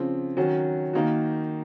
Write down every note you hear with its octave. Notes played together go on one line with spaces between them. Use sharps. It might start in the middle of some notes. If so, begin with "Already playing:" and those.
Already playing: C#3 F3 C4
D#3 F#3 C#4 F#4
D#3 A#3 D#4 F#4